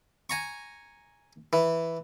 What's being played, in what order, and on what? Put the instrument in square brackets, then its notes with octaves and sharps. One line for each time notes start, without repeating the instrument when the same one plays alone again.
[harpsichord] G#5 A#5 C#6
E3